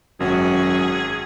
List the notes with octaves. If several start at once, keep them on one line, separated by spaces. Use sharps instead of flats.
G#1 F#2 F#4 G#4